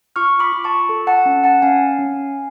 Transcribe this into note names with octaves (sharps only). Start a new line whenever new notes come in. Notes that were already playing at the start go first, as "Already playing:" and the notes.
F4 C#6 F6
B5 D6
F4
A5 C#6
A4
F#5 A5
C#4
F#5 A5
C#4 F5 G#5
C#4